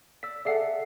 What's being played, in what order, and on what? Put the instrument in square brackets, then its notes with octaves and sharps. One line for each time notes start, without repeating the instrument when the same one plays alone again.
[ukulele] D5 [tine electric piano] E6 B6
[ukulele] G#4 A4 F#5 [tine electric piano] D5 E5 C7